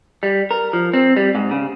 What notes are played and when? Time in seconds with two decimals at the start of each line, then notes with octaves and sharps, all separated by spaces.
0.23 G3
0.51 A#4
0.73 F3
0.94 C4
1.16 G3
1.35 G#2
1.51 C#3